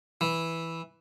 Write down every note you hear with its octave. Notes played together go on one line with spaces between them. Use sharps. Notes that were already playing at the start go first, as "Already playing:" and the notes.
E3